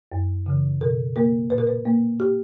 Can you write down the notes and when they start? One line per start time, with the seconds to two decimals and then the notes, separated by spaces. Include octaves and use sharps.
0.12 F#2
0.46 C#3 E3
0.81 B2 A#4
1.16 A#3 A#4
1.50 A#2 B4
1.58 A#4
1.67 B4
1.85 A#3
2.20 G4